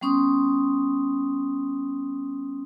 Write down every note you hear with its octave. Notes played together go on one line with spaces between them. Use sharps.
G3 B3 C#4 C6 D#6